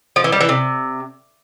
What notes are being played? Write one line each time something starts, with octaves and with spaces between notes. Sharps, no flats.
F3
E3
G3
E3
C3